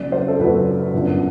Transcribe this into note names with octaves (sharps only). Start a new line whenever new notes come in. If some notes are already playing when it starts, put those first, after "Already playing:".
Already playing: F#1 F#2 F#3 D5
C5
A4
F#1 F#2 F#3 B4
G1 F#2 D3